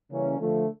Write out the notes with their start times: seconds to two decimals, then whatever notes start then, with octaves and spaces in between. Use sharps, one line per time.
0.11 C#3 E3 G3 A#3 C#4
0.39 D3 F3 A3